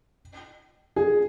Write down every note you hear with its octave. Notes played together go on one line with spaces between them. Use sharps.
G#4